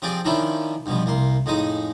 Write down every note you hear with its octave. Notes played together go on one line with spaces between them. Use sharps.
F3 C4 G4 G#4 D5
D#3 F3 A#3 C#4 D4 E4
G2 B2 F3
C2 A#3 C6
F2 A2 G#3 D#4 D#5